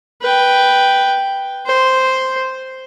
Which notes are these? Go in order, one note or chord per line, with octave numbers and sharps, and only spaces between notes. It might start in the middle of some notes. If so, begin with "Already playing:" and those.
B4 G5
C5